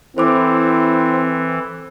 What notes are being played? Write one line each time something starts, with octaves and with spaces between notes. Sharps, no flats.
E3 C4 E4 A4 C5 D6